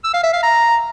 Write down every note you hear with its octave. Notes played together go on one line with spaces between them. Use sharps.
E6
F5
E5
F5
A#5